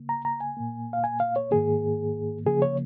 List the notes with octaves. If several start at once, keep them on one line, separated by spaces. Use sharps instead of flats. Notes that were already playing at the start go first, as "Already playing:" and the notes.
Already playing: C#3 A#3
A#5
A#5
G#5
A#2 A#3
F5
G#5
F5
C#5
G#2 D#3 A#3 G#4
C#3 F3 A#3 G#4
C#5